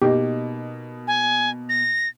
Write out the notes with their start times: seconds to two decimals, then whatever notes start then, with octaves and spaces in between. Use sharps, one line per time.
0.02 B2 A#3 D#4 G4
1.07 G#5
1.69 A#6